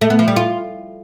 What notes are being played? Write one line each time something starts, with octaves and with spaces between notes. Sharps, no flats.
A3
B3
F3
G3
F4